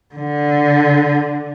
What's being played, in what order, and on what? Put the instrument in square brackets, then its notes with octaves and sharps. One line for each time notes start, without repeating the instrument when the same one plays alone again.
[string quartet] D3